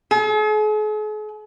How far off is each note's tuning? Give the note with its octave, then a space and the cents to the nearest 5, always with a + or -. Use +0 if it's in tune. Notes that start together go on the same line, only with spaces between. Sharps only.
G#4 +45